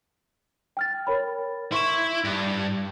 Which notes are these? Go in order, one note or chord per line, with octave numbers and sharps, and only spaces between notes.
G5 F6 A6
A#4 C#5 B5
E4 C6 C#6 E7
G2